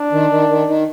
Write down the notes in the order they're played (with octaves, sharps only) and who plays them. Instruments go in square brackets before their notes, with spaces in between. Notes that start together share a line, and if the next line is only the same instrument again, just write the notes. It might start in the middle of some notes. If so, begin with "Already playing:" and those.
Already playing: [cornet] D4
[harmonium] D#3
D#3
D#3
D#3